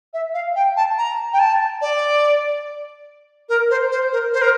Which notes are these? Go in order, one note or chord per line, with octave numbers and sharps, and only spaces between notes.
E5
F5
G5
A5
A#5
G5
A5
D5
A#4
C5
C5
A#4
C5
A#4